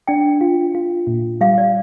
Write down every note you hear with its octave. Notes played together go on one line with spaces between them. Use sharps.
D4 G5
F4
F4
A#2
G3 F5
D5